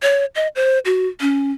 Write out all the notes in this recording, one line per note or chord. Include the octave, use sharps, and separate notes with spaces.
C#5
D#5
C5
F#4
C#4